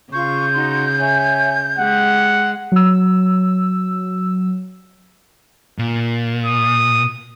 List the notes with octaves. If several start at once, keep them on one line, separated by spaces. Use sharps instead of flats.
C#3 F4 C#6 G6
D#4 F#4 C6
C#5 E5 G#5
G#3 G4 F#5
F#3 E6
A#2
D#6